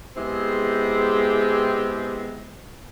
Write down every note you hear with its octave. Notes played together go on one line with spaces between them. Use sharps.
G#3 B3 C4 E4 G4 G#4